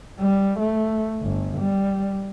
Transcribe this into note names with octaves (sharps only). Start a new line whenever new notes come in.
G3
A3
G1
G3